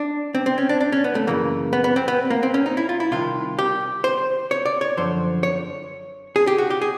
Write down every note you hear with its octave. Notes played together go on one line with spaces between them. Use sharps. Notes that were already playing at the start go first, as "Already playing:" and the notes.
Already playing: D4
C4
C4
C#4
D4
D4
C#4
B3
A3
F#2 C#3 E3 A#3
B3
B3
C4
B3
A#3
C4
C#4
D#4
E4
F4
E4
C2 C3 D#3 F4
G4
C5
C#5
D5
C#5
F#2 D3 F3 C5
C#5
G#4
G4
F#4
G4
G#4